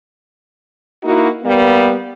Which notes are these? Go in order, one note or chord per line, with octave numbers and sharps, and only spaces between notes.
A#3 D#4 E4 F#4
G3 A#3 B3